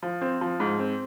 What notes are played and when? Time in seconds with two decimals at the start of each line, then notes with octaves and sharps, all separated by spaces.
0.03 F3
0.21 C4
0.41 F3
0.60 G#2
0.79 C4